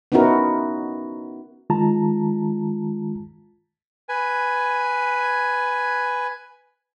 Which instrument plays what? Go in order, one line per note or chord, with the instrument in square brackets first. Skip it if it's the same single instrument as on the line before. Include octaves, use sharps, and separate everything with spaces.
[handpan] B3 C#4 D#4 E4 F#4 A#4
[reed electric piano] D#3 G#3 F4 A5 A#5
[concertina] B4 G#5